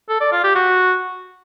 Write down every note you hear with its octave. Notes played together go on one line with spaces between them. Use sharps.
A4
D5
F4
G4
F#4